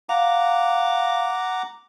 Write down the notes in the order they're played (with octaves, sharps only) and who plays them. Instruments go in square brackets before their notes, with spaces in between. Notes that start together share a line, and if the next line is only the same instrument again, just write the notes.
[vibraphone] F5 [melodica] F#5 A#5 D6